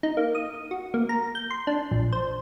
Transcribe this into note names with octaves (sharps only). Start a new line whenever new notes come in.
D#4
A#3
D#6
F#4
A#3
A#5
G6
C6
D4
A#1
C5